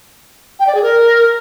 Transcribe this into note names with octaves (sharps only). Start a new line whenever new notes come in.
G5
D5
G#4
A#4